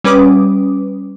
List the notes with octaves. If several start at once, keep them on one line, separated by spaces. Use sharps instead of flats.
G3 C#4 B4 D6 D#6